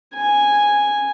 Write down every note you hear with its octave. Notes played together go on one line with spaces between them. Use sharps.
G#5